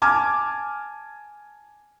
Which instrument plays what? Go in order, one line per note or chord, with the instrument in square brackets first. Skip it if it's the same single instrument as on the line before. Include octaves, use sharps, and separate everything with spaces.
[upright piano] G#5 A5 D6 F6 G#6